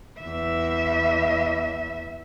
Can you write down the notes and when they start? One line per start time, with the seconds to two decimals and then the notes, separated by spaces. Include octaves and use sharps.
0.20 E2 E5